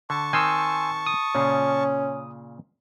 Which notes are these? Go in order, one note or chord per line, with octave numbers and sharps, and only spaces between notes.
D3 A5 C#6
D#3 C4 G#5 C6 E6
D#6
A#2 C#3 C#4 F4